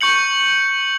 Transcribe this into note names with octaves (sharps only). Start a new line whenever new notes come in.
C#6 G6 C#7 F#7